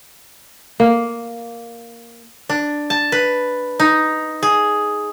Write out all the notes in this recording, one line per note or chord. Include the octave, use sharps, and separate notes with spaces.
A#3
D4
A5
B4
D#4
G#4